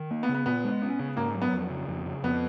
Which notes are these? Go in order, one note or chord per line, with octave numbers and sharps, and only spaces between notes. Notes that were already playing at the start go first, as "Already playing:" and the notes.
Already playing: D#3
A#3
B3
C#3
B3
A#2 B3
G#3
C#4
C#3
G#2 A#3
F#3
B3
F2
C#3
F2
C#3
F2 B3